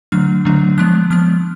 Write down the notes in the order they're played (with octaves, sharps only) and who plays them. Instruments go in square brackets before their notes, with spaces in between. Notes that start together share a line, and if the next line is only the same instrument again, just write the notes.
[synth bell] D3 F#3 A3 D4 F6
D3 F#3 A3 D4
F3 G#3 B3 F#6
F3 G#3 B3 F6